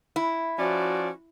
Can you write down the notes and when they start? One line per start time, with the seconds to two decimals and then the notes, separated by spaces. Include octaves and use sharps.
0.16 E4
0.58 F3 C#4 F#4 D5